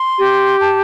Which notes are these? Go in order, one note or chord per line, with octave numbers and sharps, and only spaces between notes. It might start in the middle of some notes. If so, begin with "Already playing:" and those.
Already playing: C6
G4
A5